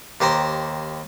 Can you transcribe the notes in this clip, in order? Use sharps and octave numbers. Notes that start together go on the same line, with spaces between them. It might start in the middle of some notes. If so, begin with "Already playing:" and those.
D#2 G4 C5 A#5 C6